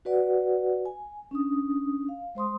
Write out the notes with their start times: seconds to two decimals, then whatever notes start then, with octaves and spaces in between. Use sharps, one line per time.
0.05 F#4 B4 D5 F#5
0.86 G#5
1.31 C#4 D4 D#6
2.09 F5
2.35 G#3 C5 C6 D#6